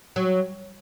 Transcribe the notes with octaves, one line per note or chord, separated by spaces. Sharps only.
F#3